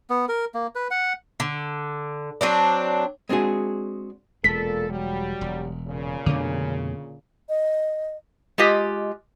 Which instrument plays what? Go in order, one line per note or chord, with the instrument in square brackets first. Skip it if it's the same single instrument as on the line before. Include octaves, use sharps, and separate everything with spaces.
[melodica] B3
A#4
A#3
B4
F#5
[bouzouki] D3
F#3 C4 D4
[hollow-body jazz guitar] G#3 C4 D4 F#4 G#4
[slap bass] E1 G#3 [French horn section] A#2 A4 [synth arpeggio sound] B6
[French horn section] F#3 G3
[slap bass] E1
[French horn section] A#2 C#3
[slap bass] F2 B2 A3 [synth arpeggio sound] D3
[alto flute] D#5
[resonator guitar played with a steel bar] G#3 F4 G4 D#5